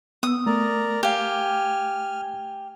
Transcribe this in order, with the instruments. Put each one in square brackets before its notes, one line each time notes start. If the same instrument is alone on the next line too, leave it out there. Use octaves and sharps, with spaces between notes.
[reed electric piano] B3 E6 [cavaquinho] D#6
[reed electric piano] A3 [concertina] A#4 D5 A#5
[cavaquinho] G4 F5 [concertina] G#5 F6